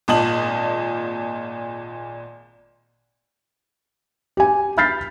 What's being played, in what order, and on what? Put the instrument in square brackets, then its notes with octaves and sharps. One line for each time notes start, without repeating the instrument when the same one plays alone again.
[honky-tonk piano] G#1 A#2 D#5 A5 F#7
[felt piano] G4 G#5
B5 F6 G6 A6 B6 C7